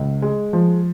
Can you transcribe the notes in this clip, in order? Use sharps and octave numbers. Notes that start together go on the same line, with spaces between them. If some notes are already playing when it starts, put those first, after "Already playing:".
Already playing: C#2
G#3
F3